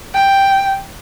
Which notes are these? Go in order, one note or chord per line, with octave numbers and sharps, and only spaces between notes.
G5